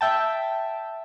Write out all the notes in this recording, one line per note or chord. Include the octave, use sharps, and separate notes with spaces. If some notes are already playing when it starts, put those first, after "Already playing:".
E5 G5 A5